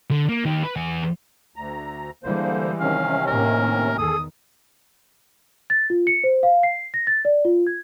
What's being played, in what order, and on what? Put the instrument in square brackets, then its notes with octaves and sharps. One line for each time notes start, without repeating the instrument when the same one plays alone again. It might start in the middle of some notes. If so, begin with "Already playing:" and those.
[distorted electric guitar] D3
A#3
D#3 G4
B4
E2 G#5
[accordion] D2 A#5
[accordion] D3 A#3 C5 [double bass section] E3 G3 G#3
[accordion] C3 D#3 C#4 [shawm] F5
[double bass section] A2 A#3 [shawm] A#4
[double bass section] E2 D#3 [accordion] G#4 A4 [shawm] D#6
[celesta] A6
F4
C#7
C5
F5
C7
A#6
A6
D5
F4
G#6